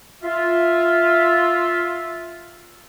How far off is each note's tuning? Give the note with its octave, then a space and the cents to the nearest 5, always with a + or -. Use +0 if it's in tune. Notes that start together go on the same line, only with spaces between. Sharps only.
F4 +0 E5 +0